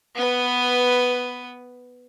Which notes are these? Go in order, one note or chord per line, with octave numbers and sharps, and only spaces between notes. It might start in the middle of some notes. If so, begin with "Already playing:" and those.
B3 B4